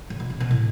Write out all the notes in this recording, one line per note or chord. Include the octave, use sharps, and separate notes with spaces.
C#3
B2
C#3
B2
A2